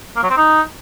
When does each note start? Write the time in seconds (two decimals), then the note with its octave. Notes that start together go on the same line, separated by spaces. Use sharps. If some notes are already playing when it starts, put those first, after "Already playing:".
0.16 A#3
0.23 F#3
0.30 C4
0.37 D#4